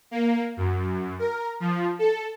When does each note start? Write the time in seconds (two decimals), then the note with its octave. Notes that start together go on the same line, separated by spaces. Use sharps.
0.11 A#3
0.57 F#2
1.19 A#4
1.60 F3
1.99 A4